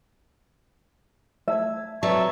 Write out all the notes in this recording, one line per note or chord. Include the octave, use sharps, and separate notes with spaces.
A3 E5 A5 G#6
F#3 C4 B4 D5 E5 A5 C#6